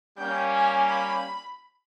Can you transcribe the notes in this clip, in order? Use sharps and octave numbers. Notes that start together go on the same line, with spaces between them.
G3 A#3 C#4 G5
G#5
B5